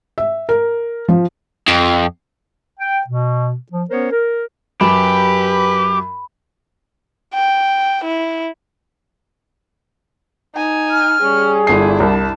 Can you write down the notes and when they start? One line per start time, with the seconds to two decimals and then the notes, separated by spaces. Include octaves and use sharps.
0.18 E5
0.49 A#4
1.08 F3
1.68 F2
2.79 G5
3.07 B2
3.72 F3
3.89 B3 C#4 A#4 C5 C#5
4.12 A#4
4.81 F#2 G4 B4 B5 E7
7.34 G5
8.04 E4
10.55 D#4 G#5
10.91 F6
11.22 G3 C#4 G#4
11.67 G1 D4 E4 G#5 C7
12.00 C2 A5